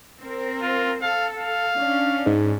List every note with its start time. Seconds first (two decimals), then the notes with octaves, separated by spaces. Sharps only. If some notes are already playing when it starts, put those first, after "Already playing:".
0.20 C4 A#4
0.62 F4
1.02 A4 F5
1.37 F5
1.76 C#4 D4
2.26 G#2